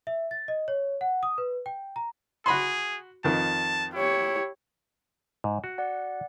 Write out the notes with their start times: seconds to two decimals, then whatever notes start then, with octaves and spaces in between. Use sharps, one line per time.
0.07 E5
0.31 A6
0.48 D#5
0.68 C#5
1.01 F#5
1.23 D#6
1.38 B4
1.66 G5
1.96 A#5
2.46 F#4 G#4 B5 C6
3.24 F2 D#3 A5
3.94 E4 G4 C#5
5.44 G#2
5.64 F#4
5.78 D5 F#5